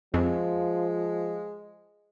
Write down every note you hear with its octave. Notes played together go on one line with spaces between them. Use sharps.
F2 F3 G#3